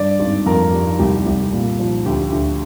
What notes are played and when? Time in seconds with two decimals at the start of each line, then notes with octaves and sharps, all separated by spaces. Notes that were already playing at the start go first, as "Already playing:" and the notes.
Already playing: G2 D5
0.19 G#1
0.46 F2 A#4
0.73 G3
0.99 C2 G4
1.27 C2
1.52 A#2
1.80 F3
2.06 D2 G4
2.32 D2